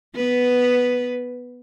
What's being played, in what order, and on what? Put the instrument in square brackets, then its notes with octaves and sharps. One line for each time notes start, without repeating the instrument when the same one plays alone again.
[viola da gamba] B3 B4